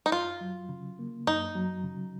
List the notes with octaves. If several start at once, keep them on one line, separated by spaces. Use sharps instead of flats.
D#4
F#2 F4
F#3
C#3
A#3
F#2 D#4
F#3
C#3